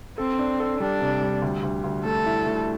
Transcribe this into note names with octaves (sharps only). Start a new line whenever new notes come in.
C4 A4
D4
A4
G3 D4
C3
G3
D2
D2
D2
A3 A4
E4
A3